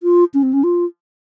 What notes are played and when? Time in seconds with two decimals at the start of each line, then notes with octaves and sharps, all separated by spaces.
0.03 F4
0.34 C#4
0.43 C4
0.53 C#4
0.63 F4